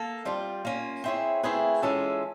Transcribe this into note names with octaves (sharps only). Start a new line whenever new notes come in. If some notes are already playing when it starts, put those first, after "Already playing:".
Already playing: A#3 A4
G3 C4 F4
A#3 C#4 F4
C4 E4 G#4 C#5
A3 C4 E4 G#4 B4
E3 G#3 C#4 F4 A4